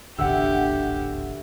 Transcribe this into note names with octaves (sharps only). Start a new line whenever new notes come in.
D#1 A1 D2 B2 G4 F#5 E6